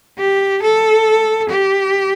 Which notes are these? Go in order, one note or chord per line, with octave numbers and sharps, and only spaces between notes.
G4
A4
G4